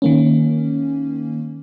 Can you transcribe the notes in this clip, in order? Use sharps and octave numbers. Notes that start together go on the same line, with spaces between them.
D#3 A#3 C#4